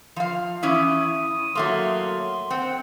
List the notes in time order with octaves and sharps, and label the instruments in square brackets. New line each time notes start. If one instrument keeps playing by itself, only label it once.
[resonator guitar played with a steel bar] F3 F5
[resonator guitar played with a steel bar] E3 C#4 E4 [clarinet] D#6
[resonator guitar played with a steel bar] F#3 A3 A#3 [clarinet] C6
[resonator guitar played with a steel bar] C4 [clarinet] F#5